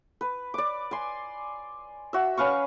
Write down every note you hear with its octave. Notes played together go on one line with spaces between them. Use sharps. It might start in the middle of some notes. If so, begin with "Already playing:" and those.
B4
D5 D6
G#5 C6
F#4 E5
C#4 B4 F5 C#6